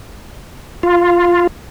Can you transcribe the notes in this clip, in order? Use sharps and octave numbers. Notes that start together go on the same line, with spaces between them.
F4